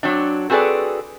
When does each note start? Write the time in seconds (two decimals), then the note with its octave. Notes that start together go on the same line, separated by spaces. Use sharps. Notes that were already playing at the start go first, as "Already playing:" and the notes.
0.03 F#3 C4 D4
0.50 C4 F#4 G#4 A4 B4 D5